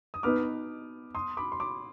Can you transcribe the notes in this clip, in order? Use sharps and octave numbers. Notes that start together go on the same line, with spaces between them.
D#6
B2 B3 D#4 B4 D6 F6
C6 D#6
B5 D6
C6
B5 D6